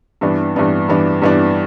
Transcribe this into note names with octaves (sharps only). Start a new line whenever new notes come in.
G2 E3 B3 D4
G2 E3 B3 D4
G2 E3 B3 D4
G2 E3 B3 D4